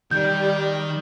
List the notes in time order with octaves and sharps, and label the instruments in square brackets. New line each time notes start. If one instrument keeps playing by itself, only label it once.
[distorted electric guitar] D#3 [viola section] G3 [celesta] G6